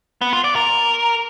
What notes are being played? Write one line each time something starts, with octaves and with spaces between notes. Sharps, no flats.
B3
F4
D5
A#4